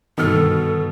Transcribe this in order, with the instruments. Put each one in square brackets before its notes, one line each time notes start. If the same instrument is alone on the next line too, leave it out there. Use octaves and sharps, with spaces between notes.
[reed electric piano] G2 D3 D#3 [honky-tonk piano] B2 F6 [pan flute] A4